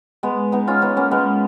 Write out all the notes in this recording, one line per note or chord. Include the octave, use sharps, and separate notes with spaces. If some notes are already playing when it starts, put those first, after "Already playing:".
G#3 B3
B3 D#4
C#4 F4
B3 D#4
A#3 C#4
G#3 B3